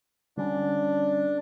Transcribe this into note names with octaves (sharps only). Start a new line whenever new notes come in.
D3 G3 C#4 D4